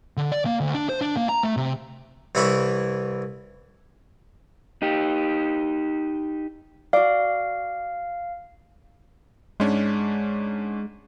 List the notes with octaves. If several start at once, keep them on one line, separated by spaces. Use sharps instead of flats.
D3
D5
A#3
D2
D4
C5
D4
A#3
A#5
A3
C3
C2 E3 E4 C#5 B5
D#4 G4
F#4 D5 F5
G#2 G#3 C#4 D4